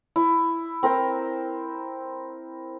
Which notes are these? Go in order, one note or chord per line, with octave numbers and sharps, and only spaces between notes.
E4
C4 A#4 C5 A#5